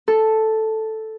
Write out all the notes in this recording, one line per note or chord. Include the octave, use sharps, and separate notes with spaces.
A4